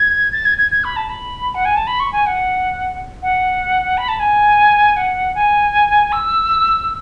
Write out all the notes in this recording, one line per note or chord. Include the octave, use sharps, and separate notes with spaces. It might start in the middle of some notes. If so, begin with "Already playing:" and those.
Already playing: G#6
A6
G#6
G#6
G#6
B5
A5
B5
F#5
G#5
A5
B5
C#6
G#5
F#5
F#5
B5
A5
G#5
F#5
G#5
E6